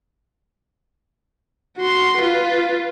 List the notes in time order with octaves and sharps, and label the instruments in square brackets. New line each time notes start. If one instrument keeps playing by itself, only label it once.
[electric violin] F#4 C6
F4 B4